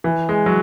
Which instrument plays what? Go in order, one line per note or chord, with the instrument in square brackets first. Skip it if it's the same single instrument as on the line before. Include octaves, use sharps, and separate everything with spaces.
[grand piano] E3
G#3
F#3